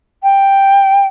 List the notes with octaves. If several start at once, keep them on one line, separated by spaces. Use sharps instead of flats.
G5